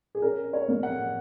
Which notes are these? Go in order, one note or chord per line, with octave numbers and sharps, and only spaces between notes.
G#4
C#4 A#4
C#5
A#3
F#5